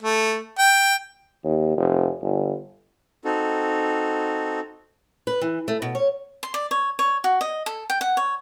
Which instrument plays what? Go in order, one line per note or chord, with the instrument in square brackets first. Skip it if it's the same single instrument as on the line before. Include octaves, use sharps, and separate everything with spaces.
[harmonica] A3
G5
[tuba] D#2
F1
G1
[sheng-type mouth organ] C4 D#4 F#4 A4
[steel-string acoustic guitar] B4
E3
A3
B2
C#5
[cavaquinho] C6
D5
C#5
C#5
F#4
D#5
A4
G5
F#5
C#5